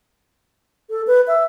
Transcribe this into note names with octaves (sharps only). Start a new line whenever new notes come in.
A4
B4
E5